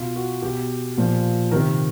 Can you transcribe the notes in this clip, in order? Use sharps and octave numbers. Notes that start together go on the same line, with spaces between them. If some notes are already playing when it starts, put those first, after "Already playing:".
Already playing: B2 F4
F#4
B2 G4
A#2 F3
C3 D#3 A#4